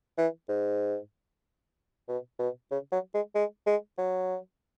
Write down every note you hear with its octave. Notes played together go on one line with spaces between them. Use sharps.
E3
G#2
B2
B2
C#3
F#3
G#3
G#3
G#3
F#3